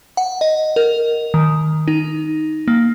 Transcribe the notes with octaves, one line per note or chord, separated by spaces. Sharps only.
F#5
D#5
A#4
D#3
D#4
A#3